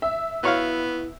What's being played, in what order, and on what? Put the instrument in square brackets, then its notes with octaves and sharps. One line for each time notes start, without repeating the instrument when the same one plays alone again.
[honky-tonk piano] E5
[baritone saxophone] B3 [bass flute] E4 [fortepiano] F#4 C#5 F5